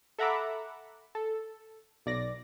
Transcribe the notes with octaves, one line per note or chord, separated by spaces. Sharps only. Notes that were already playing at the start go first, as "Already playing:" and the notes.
A4 E5 F#5 A#5 B5 D6
A4
B1 D5 A#6